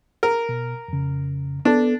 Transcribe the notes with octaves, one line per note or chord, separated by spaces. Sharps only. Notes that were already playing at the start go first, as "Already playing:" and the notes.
A#4
B2
F2 C#3
B3 D4 A4